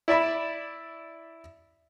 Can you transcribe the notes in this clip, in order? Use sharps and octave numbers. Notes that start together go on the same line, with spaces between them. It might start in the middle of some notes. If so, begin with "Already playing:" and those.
E4 D5 E5 B5